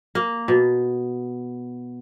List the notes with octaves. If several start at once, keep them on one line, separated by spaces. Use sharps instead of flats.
A#3
B2